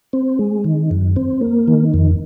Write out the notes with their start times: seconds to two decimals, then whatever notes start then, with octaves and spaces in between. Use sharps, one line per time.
0.13 C4
0.39 G#3
0.64 D#3
0.91 F#2
1.16 C4
1.41 A#3
1.68 D#3
1.94 F2